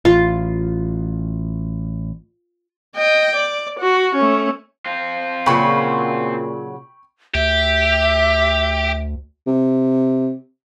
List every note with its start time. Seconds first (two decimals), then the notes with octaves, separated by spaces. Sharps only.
0.05 A1 F4
2.96 D#5 G5
3.35 D5
3.79 F#4
4.15 A3 C#4
4.86 C4 F4
5.46 A#2 C#3 F#3 G5 B5 C#6
7.34 D2 G4 E5
9.47 C3